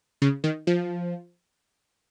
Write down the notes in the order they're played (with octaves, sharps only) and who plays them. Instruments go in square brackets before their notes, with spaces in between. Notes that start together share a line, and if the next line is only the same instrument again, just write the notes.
[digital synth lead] C#3
D#3
F3